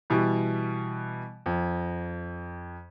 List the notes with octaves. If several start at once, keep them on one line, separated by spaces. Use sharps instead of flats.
B2 E3 G3
F2